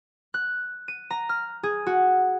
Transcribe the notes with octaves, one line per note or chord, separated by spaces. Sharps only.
F#6
D#7
A#5
F6
G#4
F#4